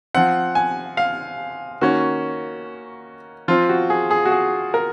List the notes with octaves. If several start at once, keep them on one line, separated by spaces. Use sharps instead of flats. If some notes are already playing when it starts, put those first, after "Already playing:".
F3 C4 F#5
G#5
F5
D#3 A#3 C#4 F#4
F3 C4 F4
F#4
G#4
G#4
F#4
G#4
A#4